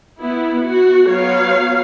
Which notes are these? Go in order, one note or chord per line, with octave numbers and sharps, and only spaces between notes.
B3 E4
F#4
F#3 B3 C#5 F5